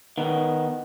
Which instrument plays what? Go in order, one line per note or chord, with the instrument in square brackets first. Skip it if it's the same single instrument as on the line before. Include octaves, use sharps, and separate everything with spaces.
[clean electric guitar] D#3 B3